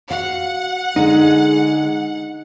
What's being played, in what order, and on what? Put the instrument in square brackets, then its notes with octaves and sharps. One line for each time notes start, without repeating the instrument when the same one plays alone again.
[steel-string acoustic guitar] F#4 F5 [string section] F#5
[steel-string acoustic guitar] D3 D4 G#4 [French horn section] G#3 [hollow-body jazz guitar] D#4